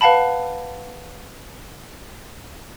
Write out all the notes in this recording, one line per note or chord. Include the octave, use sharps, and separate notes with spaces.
B4 F5 F#5 A5 B5